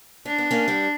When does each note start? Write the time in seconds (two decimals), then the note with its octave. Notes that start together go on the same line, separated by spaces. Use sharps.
0.26 C#4 D4
0.38 B3
0.51 A#3 C#4
0.68 G3 B3